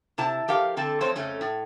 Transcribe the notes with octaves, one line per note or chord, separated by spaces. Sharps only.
C3 E4 A5
F3 G4 A#4 F5
D3 C4 A4 A5
F3 A3 C4 C5 C#5
F2 C#3 A3 C#4
A2